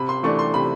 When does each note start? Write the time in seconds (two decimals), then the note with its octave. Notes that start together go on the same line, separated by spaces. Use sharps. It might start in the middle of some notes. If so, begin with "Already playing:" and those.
Already playing: C3 B5
0.09 C6
0.23 E3 A3 D4 C#6
0.39 C6
0.54 C3 B5